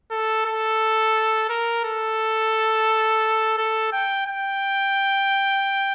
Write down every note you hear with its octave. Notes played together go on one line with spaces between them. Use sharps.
A4
A4
A#4
A4
A4
G5
G5